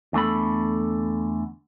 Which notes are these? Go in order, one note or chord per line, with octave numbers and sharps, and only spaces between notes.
E2 D3 A3 A4 B5